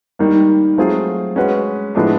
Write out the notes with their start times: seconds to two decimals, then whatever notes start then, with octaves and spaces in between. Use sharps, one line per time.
0.19 D#3 G3 A#3
0.78 F#3 A3 C4 F4 G#4
1.36 G#3 C#4 F#4 B4
1.95 A2 F3 G#3 B3 D4